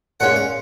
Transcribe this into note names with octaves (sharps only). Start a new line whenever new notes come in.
A#2 G#3 C#4 F#5
F5